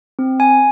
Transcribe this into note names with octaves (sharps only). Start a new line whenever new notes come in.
C4
G#5